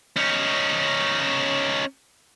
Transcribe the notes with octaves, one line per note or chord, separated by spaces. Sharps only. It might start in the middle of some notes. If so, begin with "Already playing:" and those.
C#4 D#4